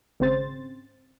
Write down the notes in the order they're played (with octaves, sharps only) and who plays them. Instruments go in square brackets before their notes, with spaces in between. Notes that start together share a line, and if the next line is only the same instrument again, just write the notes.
[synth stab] G#1 C#3 C4 C5 A6